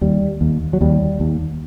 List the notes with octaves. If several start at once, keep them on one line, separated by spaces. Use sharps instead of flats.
D#2 G3
D#2
F#3
D#2 G3
D#2